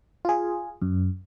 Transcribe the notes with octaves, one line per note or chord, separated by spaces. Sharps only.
F4 G#4
F#2